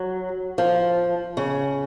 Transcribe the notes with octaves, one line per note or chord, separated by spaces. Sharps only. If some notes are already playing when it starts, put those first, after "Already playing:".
Already playing: F#3
F3
C#3